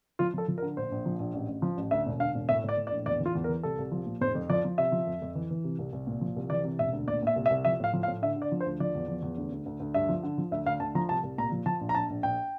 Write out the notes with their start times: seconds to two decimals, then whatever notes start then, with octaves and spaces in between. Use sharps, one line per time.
0.19 F3 F4
0.34 F3 A4
0.48 F3
0.58 A#4
0.62 D3
0.77 A#1 C5
0.92 A#1
1.06 F3
1.19 A#1
1.34 A1
1.48 A1
1.62 F3
1.77 A1
1.91 D2 E5
2.06 E1
2.20 D3 F5
2.35 E1
2.49 A2 E5
2.64 A2
2.69 D5
2.77 A2
2.87 D5
2.92 A#1
3.06 E2 D5
3.20 E3
3.26 F4
3.35 E2
3.44 A#4
3.49 E3
3.63 C2 A4
3.78 C2
3.92 F3
4.06 A#2
4.21 F1 C5
4.35 F2
4.49 F3 D5
4.65 F3
4.78 C3 E5
4.92 F3
5.07 F2
5.22 F2
5.35 E3
5.51 E3
5.64 C3
5.79 C2
5.93 C2
6.07 A#2
6.21 F3
6.36 C2
6.50 E3 D5
6.64 C3
6.79 E1 E5
6.93 D2
7.08 A#2 D5
7.23 A#2 E5
7.36 C2
7.46 E5
7.50 C2
7.65 F3 E5
7.80 A2 F5
7.94 F3
8.03 F5
8.08 A2
8.22 D3 E5
8.36 D3
8.42 D5
8.52 F3
8.60 C5
8.66 D2
8.80 F3 D5
8.95 E2
9.08 F3
9.22 E2
9.38 D2
9.52 D2
9.66 D2
9.80 D2
9.94 G2 E5
10.09 F3
10.23 D3
10.38 F3
10.51 D2 E5
10.66 D2 F5
10.80 D2 A5
10.95 F3 A#5
11.09 C2 A5
11.23 C2
11.38 A#2 A#5
11.52 F3
11.66 F3 A5
11.81 A#1
11.89 A#5
11.95 A#1 A5
12.10 A#1
12.23 A#1 G5